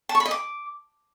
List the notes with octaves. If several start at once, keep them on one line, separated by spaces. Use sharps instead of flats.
A5
C#6
B5
D#5
D6